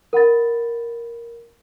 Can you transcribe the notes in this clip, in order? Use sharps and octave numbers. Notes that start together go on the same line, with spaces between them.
A#4 F#5 B5 A6